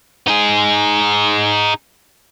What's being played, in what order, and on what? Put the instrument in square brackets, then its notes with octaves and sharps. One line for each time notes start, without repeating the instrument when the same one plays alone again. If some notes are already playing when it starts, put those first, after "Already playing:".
[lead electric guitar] D#4 G#4